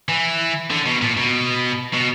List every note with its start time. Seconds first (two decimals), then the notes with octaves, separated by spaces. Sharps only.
0.09 E3
0.70 D3
0.86 B2
1.01 A#2
1.17 B2
1.94 B2